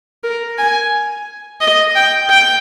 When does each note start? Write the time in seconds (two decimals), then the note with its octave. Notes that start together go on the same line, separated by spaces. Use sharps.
0.24 A#4
0.58 G#5
1.61 D#5
1.95 G5
2.29 G5